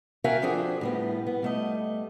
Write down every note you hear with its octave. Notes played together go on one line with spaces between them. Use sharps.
F#4 A#4 E5 F5 G5 G#5
F3 C4 D4 F#4 G#4 A4
A2 G3 B3
B3
G3 A3 D#5